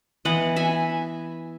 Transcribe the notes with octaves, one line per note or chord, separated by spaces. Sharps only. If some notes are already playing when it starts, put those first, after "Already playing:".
E3 B3 D#5 F#5
E5 G#5